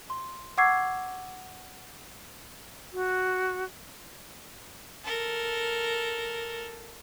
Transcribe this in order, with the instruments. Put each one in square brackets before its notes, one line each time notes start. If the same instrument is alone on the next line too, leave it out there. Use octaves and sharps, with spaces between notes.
[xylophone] C6
F#5 C#6 D6 E6 G#6 C7
[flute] F#4
[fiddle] A4 A#4